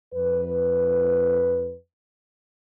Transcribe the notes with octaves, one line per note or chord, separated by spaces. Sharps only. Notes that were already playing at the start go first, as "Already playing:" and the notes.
F2 B4